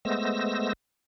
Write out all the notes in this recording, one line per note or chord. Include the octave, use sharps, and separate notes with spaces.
G#3 A3 B3 C5 E6 A#6